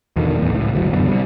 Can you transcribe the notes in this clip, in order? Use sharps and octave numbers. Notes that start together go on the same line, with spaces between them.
E2 B2 D3 D#3
E2 A2
C#2 A2
G1 D2 A#2 F#3
C2 F#2 D3 B3
C3 G3